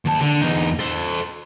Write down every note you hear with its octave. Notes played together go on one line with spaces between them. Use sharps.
D#2 A5
D3
E2 D#4
A4 C5